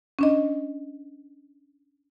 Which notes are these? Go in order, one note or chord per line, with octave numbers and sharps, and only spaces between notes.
C#4 D4 D#5